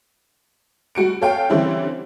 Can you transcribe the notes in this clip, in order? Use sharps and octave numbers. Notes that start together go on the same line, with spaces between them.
G3 F#4 C#7 D7
A4 C#5 F5 G5
D3 E3 G3 C4 C#4 E4